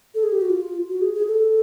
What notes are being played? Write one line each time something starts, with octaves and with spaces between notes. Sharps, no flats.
A4
G#4
G4
F#4
F4
F#4
G#4
G#4
A4